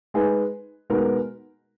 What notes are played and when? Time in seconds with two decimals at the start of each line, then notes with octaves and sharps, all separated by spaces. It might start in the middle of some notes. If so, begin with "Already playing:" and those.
0.14 G#3 D#4 G#4 B4
0.90 B2 G#3 B3 D#4 A#4